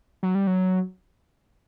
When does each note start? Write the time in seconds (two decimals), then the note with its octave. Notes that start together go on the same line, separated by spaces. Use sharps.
0.23 F#3
0.35 G3
0.47 F#3